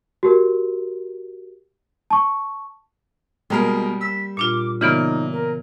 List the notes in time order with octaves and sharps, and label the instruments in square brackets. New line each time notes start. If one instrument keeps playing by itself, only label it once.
[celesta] F#4 G4 A#4
A5 C#6
[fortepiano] B2 G#3 A#4 [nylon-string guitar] G3 A#3
[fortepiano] E6 [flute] B6
[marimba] A#2 D4 F4 [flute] D6
[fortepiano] A#2 [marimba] C#3 E3 B3 [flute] D#4
[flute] A#4